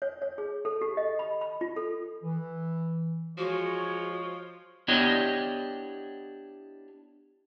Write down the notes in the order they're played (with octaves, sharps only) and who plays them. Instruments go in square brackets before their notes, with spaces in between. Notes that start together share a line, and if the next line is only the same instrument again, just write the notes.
[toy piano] C#5
C#5
G#4
A4
G4
D#5
B5
B5
F4
A4
[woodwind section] E3
[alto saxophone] F3 [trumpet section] G#3 C#5 [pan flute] F#4
[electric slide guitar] B3 D4 E4 G4 C#5 D#5